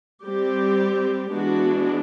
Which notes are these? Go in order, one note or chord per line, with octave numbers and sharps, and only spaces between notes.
G3 C4 G4
E3 G#3 B3 D4 F#4